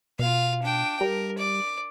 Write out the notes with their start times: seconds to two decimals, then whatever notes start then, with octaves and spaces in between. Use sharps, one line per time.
0.19 B2 F4 F5
0.62 D4 G5
1.01 G3 A#4
1.38 D5